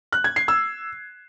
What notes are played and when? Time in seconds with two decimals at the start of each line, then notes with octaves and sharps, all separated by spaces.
0.12 F#6
0.24 G#6
0.36 C7
0.48 E6